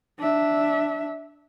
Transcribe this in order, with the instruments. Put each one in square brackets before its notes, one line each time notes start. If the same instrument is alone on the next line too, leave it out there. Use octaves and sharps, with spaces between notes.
[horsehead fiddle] D4 E5